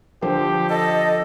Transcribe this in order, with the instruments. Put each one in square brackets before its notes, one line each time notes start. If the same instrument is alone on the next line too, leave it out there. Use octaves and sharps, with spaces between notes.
[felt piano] D3 F3 C5 [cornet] G4
[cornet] A4 [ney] D#5